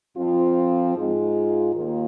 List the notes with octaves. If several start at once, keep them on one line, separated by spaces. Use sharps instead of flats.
F2 F3 C4 F4
G#2 G#3 F4
D#2 D#3 A#3 F4